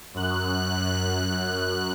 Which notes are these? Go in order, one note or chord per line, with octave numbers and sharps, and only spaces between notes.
F#2 F#6